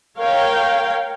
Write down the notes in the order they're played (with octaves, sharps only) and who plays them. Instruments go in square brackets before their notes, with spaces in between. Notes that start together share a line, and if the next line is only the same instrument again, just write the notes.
[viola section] A#4 C#5 F5 G5